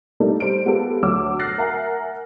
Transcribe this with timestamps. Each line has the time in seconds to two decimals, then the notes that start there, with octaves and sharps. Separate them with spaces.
0.20 G3 A3 A#3 D4 D#4 A4
0.40 G3 C5 C#7 D7
0.65 G#3 B3 F4 G4 A4
1.03 D2 F#3 D6 E6
1.39 F6 F#6 A6 A#6 C7
1.58 A#4 E5 F#5 G#5 A#5